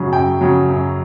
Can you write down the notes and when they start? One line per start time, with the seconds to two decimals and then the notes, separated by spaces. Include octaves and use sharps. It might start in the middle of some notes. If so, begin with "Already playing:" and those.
Already playing: F#2 C#3 F#3
0.12 F#2 G5
0.41 C#3 F#3
0.69 F#2